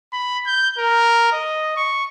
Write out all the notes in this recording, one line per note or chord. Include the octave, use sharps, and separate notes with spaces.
B5
G6
A#4
D#5
C#6